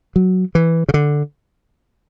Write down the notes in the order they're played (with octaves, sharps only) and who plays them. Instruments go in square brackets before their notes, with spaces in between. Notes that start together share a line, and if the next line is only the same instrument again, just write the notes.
[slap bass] F#3
E3
C#3
D3